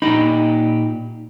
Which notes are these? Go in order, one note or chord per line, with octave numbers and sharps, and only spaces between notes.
A#2 D#4 G4 B5